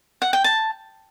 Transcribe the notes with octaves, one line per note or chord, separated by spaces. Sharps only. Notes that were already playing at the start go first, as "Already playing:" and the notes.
F#5
G5
A5